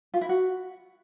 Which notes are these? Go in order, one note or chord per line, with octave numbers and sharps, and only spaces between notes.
F4
E4
F#4